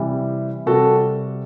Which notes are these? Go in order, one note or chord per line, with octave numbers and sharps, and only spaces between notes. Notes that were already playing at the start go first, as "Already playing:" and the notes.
Already playing: C3 E3 G3
C3 G3 F#4 A4